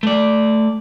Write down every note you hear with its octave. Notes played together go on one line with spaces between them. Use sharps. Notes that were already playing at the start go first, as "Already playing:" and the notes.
A3 D5